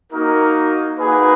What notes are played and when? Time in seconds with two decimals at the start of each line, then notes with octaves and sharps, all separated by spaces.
0.12 A#3 D#4 F#4 A#4
0.99 A#3 D#4 F#4 G#4 B4